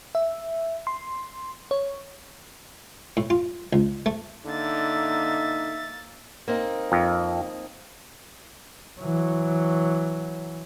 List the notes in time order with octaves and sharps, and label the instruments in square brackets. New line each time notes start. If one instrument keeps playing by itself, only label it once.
[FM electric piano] E5
C6
C#5
[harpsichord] A2
F4
C#2
A3
[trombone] D3 [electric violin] A#3 A6 [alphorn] D#4 [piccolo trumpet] E5
[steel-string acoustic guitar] A#3 C4 D#4
[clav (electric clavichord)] F2
[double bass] E3 F#3